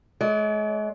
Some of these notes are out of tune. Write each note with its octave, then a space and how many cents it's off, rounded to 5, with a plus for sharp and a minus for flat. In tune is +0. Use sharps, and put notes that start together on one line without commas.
G#3 +40 D5 -45